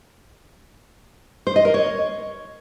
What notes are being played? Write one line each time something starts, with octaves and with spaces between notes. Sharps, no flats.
C5
D#5
A#4
C#5